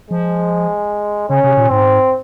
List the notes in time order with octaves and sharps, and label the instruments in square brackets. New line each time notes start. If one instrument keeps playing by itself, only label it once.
[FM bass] F3 [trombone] G#3
[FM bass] C#3 [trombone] C#4
[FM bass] C3
A#2
[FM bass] G#2 [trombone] C4